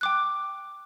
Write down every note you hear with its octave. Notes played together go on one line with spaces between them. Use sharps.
G5 D6 F#6